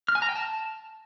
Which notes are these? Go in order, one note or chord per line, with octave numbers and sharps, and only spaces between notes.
F6
G#5
A#5
G5
A5